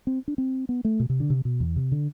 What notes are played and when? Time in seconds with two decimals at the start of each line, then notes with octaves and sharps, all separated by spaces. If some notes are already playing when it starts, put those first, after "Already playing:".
0.07 C4
0.28 D4
0.38 C4
0.69 B3
0.85 A3
1.00 B2
1.10 C3
1.20 D3
1.30 C3
1.45 B2
1.60 E2
1.76 C3
1.92 D3